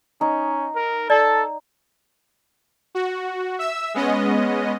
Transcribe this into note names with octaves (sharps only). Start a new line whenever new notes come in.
C#4 D#4
A#4
A4 D5 A5
F#4
E5 E6
G#3 B3 C#4 D#5